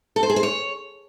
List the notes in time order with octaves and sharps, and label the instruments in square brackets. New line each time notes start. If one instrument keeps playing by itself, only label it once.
[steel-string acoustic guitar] A4
C5
G#4
C5
C#5